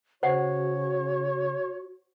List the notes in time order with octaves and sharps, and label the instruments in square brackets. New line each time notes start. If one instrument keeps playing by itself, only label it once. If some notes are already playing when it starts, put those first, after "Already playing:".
[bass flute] C#3 [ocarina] F#4 [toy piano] C5 F#5 [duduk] C#5